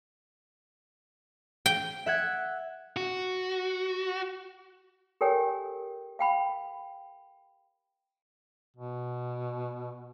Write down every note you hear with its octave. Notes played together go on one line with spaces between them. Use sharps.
G5
E5 F#5 G#6
F#4
G4 A4 A#4 C#5 G5 G#5
F5 G5 B5
B2